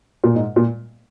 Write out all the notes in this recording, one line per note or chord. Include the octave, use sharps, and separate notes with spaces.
A#2
G#2
A#2